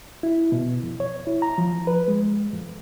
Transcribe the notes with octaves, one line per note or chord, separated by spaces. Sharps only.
E4
B2
F2
C#5
E4
A#5
F3
B4
G#3
F2